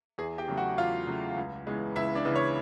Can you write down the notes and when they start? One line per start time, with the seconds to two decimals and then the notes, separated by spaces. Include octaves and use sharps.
0.18 E2 G#4 G#5
0.38 G4 G5
0.48 C#3 F#3 A3
0.57 F#4 F#5
0.77 E2 F4 F5
1.07 C#3 F#3 A3
1.36 C#2
1.66 C#3 E3 G#3 B3
1.96 C#2 E4 E5
2.15 D4 D5
2.25 C#3 E3 G#3 B3
2.36 C#5